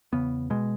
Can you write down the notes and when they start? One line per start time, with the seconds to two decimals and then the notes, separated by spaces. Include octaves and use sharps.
0.12 E2 C#3 B3
0.50 B2 G#3